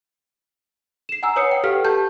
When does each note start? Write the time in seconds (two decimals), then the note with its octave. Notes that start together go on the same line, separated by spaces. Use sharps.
1.09 C7 E7
1.23 F#5 G#5 A#5 E6
1.36 B4 C#5 D#6 C7 C#7
1.51 F#5 G5
1.64 G4 A4 B4 F5 F6 B6
1.85 G4 A5 G6